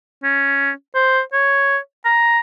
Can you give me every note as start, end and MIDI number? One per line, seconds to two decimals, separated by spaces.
0.23 0.71 61
0.95 1.21 72
1.33 1.77 73
2.05 2.40 82